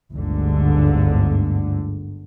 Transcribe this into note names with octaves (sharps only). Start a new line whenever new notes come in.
G1 D2 G#2 D3